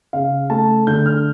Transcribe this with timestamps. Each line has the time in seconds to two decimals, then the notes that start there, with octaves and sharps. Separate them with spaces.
0.13 C#3 F5
0.50 A3 A5
0.87 D3 G6
1.06 F6